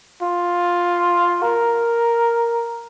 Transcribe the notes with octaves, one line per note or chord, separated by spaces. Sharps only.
F4
A#4